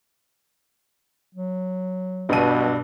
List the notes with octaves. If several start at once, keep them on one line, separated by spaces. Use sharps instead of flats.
F#3
B1 G2 B2 D4 D#7